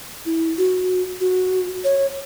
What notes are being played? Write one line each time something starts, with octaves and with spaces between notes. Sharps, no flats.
E4
F#4
F#4
C#5